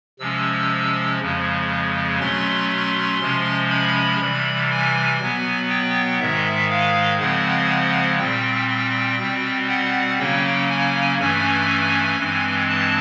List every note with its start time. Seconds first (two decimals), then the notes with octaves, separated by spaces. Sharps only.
0.19 C3 F3 G#3 C#4 E6
1.20 F2 C#3 F3 G#3
2.19 B2 F#3 A3 C#4 C6
2.70 C6
3.20 C3 F3 G#3 C#4
3.70 B5
4.20 C3 E3 G3
4.70 G#5
5.20 B2 F#3 B3
5.70 G5
6.19 G#2 D#3 G#3 E5
6.70 F5
7.19 C#3 F3 G#3 C4 F#5
8.19 A#2 G3 C4 G5
8.69 G5
9.19 B2 G3 C4
9.69 F#5
10.19 C#3 F#3 A#3 C#4 G5
10.68 G#5
11.19 G2 E3 A3 C#4 G#5
12.19 G2 E3 G#3 C4
12.69 A5